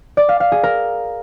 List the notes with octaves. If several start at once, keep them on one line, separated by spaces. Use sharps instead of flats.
D5
F5
F5
G#4
A#4